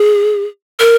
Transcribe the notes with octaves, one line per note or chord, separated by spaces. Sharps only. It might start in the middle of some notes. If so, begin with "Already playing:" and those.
Already playing: G#4
A#4